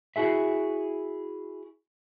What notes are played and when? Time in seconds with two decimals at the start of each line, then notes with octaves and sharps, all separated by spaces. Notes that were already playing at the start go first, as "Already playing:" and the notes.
0.16 E4 F#4 G#4 E5